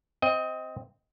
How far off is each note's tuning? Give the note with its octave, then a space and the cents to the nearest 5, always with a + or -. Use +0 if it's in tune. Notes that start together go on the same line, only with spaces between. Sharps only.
C4 +0 D#5 +20